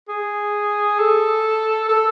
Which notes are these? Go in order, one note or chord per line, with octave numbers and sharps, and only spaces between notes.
G#4
A4
A4